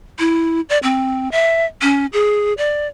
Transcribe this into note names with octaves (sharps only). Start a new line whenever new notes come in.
E4
D5
C4
E5
C#4
G#4
D5